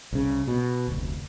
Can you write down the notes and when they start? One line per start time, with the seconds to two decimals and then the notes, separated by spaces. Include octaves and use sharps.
0.12 C2 C#3
0.47 B2
0.88 F1 D2